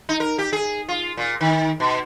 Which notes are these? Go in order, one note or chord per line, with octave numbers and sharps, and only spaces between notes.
D#4
A#4
G4
G#4
F4
A#2
D#3
B2